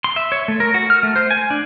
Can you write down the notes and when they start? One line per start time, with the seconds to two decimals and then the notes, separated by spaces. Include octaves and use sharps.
0.04 C6
0.16 E5
0.32 C#5
0.48 A3
0.60 A#4
0.74 F#4
0.90 F6
1.03 A3
1.16 C5
1.31 G#5
1.50 D4